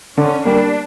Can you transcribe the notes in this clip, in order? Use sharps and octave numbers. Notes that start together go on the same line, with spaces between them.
D3 C#4
G3 A#3 D4